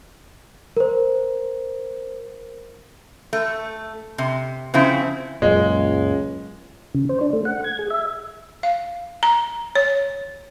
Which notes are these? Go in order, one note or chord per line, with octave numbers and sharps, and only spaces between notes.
A#4 C5
A3
C3
C#3 F3 C4 E4
C#2 F#2 A#2 G#3
C#3
C5
D4
A3
F#5
G#6
G#4
E5
F5
A#5
C#5